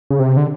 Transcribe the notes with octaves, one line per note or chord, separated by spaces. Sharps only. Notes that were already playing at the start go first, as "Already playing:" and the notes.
C#3
C3
D3